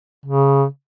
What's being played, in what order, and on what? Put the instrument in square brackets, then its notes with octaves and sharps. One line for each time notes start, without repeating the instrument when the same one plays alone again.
[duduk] C#3